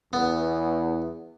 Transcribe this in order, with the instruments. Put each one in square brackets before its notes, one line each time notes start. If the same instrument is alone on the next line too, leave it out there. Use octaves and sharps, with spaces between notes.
[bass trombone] E2 [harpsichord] B3